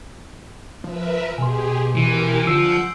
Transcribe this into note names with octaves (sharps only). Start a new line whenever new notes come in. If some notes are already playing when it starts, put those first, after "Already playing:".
F3 A#4 B4 E5
B2 G4 G#4 G#5 C6
E3 G4 A#4
D3 F3 F#5 E6 G6 C7 D7